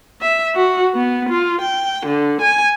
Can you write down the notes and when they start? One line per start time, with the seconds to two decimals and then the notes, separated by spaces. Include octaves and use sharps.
0.21 E5
0.55 F#4
0.95 B3
1.29 F4
1.61 G5
2.06 D3
2.41 G#5